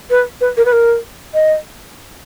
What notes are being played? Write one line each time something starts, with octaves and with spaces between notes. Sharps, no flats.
B4
B4
A#4
B4
A#4
D#5